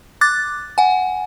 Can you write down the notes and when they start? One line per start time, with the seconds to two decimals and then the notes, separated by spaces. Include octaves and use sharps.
0.21 D6 F#6 A6
0.78 F#5 G#5